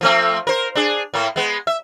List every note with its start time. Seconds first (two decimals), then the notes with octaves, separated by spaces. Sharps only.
0.01 F3 A3 C4
0.47 A#4 C5
0.75 D4 G#4
1.14 A2 A#3
1.36 G#3 B3
1.67 E5